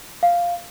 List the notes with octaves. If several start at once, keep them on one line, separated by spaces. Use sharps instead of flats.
F5